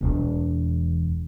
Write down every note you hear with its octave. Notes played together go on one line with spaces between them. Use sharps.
E1 E2